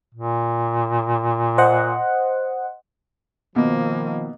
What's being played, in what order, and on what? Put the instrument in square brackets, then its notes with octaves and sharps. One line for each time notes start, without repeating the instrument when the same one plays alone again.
[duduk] A#2
[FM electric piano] C5 D#5 F#5
[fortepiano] B2 [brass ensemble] D#3 F3 [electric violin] A#3